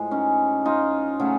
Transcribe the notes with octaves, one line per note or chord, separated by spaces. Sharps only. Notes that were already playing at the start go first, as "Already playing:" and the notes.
Already playing: A2 F3 G#3
C#4 D#4
D#4 F4
C#3 F#3 A3